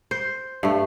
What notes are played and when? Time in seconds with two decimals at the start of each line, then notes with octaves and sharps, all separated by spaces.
0.11 C5
0.63 G2 A3